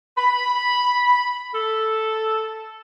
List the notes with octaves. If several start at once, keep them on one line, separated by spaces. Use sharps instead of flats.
B5
A4